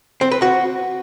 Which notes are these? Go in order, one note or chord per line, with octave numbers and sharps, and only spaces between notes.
C4
B4
F#4